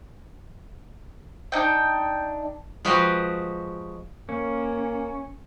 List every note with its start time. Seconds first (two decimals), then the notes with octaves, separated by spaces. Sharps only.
1.52 D4 D#4 G5
2.85 F3 G#3 F#4 G4 B4 D#5
4.29 A#3 C#4